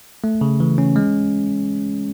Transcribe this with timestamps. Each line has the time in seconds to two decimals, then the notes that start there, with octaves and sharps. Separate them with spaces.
0.24 A3
0.41 C#3
0.60 E3
0.78 C#4
0.96 G#3